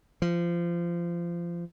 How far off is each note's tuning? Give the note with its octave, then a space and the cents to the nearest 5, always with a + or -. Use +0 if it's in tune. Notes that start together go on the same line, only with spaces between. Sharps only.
F3 -25